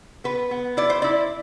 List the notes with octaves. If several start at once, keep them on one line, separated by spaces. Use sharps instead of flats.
B3 B4
B3
E4 D5
C5
E4 D5